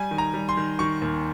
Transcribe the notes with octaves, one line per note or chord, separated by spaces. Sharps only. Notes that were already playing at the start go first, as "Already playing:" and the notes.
Already playing: G3 G#5
D#3
A#5
G3
C6
D#3
D#3 C#6
D#2